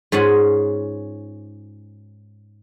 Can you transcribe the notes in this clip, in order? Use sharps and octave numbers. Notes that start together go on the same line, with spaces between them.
G#2 C#4 F4 F#5 G#5